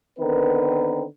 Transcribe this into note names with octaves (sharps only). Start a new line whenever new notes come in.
D3 D#3 B3 C4 A#4 B4